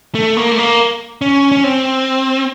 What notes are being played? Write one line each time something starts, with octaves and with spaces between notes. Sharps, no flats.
A3
A#3
A3
A#3
C#4
C#4
C4